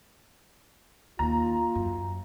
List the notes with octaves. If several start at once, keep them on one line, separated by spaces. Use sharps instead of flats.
D#2 F4 A#5
F#2